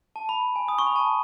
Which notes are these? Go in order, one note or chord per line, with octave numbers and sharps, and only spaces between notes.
A5
B5
A5
G#5
D#6
C#6
B5
A5